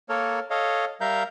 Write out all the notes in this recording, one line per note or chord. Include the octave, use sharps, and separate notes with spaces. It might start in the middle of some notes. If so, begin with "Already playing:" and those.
A#3 A4 A#4 C#5
A4 C#5 D#5 F5
G3 A#4 E5 F5 A#5 G6